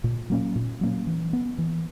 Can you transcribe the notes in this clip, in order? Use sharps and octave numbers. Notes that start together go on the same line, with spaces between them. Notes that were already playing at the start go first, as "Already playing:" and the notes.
A#2
F#3 A#3 C#4
A#2
F#3 A#3 C#4
E3
B3
E3